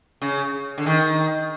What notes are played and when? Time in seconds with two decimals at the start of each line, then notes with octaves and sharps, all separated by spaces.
0.22 C#3
0.78 D3
0.86 D#3